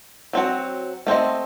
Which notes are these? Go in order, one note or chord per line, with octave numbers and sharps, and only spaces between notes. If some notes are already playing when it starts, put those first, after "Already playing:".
F#3 C4 F#4
A3 C4 E4 C5 D#5